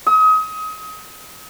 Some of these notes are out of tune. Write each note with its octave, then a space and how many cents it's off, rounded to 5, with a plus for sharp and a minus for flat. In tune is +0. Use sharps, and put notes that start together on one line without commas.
D#6 +30